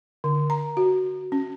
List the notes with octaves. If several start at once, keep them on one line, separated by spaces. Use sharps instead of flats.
D3
A#5
F#4
C#4